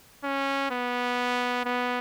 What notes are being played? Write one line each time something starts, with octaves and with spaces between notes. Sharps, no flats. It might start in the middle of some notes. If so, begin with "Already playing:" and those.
C#4
B3
B3